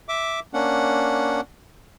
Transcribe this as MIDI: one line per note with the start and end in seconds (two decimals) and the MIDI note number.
0.09 0.40 76
0.09 0.40 86
0.54 1.41 58
0.54 1.41 61
0.54 1.41 62
0.54 1.41 78